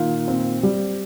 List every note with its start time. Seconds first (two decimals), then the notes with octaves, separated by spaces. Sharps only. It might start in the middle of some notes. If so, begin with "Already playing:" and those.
Already playing: A#2 D#3
0.28 C4
0.63 G3